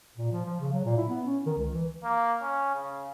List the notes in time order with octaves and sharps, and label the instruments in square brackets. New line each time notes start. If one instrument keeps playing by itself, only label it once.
[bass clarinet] A#2
F3
F3
C#3
F#3
A#2
E4
B3
C#4
D#3
C#2
E3
[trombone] A#3
C#4
C#3